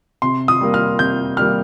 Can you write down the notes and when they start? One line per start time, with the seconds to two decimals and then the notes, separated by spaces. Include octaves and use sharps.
0.22 C3 C6
0.48 D#6
0.61 G3 A#3
0.74 F6
0.99 C3 G6
1.37 G3 A#3 F6